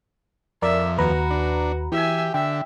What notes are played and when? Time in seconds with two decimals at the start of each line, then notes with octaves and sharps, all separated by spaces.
0.62 F2 A#4 D5 E5
0.98 D#2 F#4 B4 A#5
1.31 D4
1.92 E3 G4 E5 G#5
2.34 D3 E5 G5